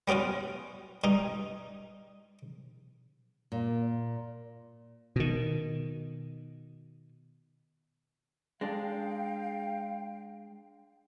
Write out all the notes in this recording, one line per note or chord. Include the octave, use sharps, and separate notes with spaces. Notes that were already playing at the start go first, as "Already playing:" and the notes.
G3 B3 C#4 F4 F#4
G2 D#4
A#2
B2 D#3
G#3 D4 F5 G5